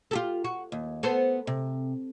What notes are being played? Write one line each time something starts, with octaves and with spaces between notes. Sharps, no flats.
F4 G4 A4
F#4
D#2
B3 A4 C5
C3